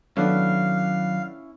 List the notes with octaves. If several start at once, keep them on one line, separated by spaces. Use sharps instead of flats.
D#3 F#3 A3 B3 C#4 D4 E4 F5